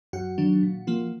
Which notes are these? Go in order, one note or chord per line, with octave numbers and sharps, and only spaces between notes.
F#2 F#4 F#5
D#3 F#3 D4
A#2
F3 A#3 F4